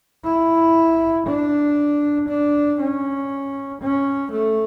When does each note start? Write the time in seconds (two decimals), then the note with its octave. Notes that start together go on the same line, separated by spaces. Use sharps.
0.25 E4
1.27 D4
2.29 D4
2.80 C#4
3.82 C#4
4.33 A3